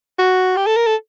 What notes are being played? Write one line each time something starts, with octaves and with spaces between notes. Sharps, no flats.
F#4
G4
A4
A#4
A4